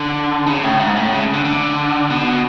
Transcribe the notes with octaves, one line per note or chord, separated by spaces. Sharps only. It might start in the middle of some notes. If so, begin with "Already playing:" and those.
Already playing: D3
C#3
A2
G#2
A2
C#3
D3
D3
B2